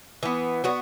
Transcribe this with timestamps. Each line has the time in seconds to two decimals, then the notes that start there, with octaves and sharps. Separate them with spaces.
0.23 E3 B3
0.64 F#3 B3 F#4